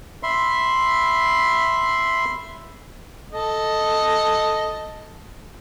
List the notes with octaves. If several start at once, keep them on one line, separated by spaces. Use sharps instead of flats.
E5 B5 C6
A4 D#5